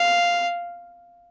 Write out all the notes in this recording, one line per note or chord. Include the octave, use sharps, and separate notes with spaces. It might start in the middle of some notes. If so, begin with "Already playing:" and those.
Already playing: F5